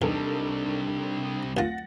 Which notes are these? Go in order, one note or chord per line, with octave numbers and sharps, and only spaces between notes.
E2 C3 G3 D4 D#4 A4 A#4
D2 F4 F#5 A6 A#6